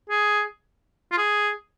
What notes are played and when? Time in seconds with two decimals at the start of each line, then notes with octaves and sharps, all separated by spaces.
0.10 G#4
1.12 F4
1.18 G#4